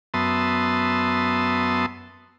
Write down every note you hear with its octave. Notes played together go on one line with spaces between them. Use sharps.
F#2 B3 E5 A5 C6 D#6